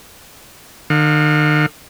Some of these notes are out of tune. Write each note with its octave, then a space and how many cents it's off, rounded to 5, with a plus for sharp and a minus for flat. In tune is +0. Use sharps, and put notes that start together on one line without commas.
D#3 -45 F5 +40